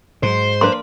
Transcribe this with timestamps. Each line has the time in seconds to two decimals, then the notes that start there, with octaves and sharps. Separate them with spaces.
0.23 G#2 F#3 C5
0.61 A#3 D4 B4 C6